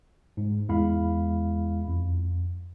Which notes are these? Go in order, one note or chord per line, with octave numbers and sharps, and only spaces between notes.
G#2
E2 G#3 E4 F5 B5
F2